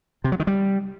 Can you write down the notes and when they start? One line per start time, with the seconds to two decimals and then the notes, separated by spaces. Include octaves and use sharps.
0.24 C3
0.32 F#3
0.40 D#3
0.47 G3